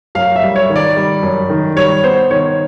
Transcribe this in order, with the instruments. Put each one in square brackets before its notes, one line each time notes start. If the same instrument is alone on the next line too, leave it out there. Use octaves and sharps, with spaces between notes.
[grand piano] F#2 F5
E5
G3
C#5
D#3
D5
G3
F#2
D#3
G3 C#5
B3 C5
D#3 C#5